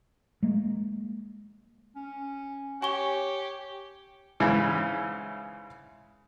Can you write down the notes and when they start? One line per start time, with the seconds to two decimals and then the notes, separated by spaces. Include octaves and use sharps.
0.43 G#3 A#3
1.96 C#4
2.82 G4 C#5 G#5 C#6 G7
4.40 G#2 C#3 E3